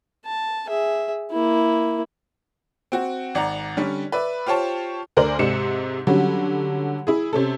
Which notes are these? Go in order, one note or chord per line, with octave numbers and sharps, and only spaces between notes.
A5
G#4 E5
A#3 E4
C4 F#4
G#1 D5 F#5 A#5
D3 G3 C#4
B4 D5 E5
F4 G4 C5 C#5 A5
D2 A#4 C5 D5 F#7
G#2 C3 C#7 E7
D3 F#3 G3 C#4
E4 G#4
C3 C#4 A4